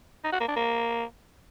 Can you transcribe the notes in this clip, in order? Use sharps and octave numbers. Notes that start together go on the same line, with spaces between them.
D#4
F#4
A#3
D4
A#3